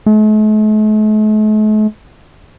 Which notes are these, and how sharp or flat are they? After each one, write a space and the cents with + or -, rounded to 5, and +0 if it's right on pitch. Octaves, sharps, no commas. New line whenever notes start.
A3 -45